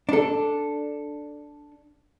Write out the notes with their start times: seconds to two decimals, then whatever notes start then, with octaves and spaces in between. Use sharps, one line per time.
0.09 D4 A4